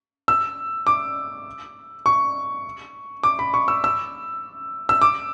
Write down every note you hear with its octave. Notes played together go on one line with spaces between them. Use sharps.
E6
D6
C#6
D6
B5
C#6
E6
E6
E6
D6